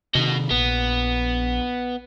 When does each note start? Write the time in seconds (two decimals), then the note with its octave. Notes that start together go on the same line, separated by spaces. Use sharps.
0.15 C3 D#3 F#4 D#5
0.51 A#1 B3